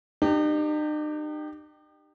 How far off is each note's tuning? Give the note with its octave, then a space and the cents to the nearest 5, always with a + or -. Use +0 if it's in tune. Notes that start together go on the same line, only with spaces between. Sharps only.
D#4 -45 G4 +0